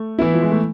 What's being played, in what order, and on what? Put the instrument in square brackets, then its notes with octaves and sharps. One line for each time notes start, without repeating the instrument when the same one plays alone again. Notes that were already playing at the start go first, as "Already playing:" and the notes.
Already playing: [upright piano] A3
[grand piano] E3 B3 E4
[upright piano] F3
G#3
A3